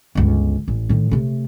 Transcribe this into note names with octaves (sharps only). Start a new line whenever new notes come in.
G1 C#2
A1
A2 D#3
C3 A3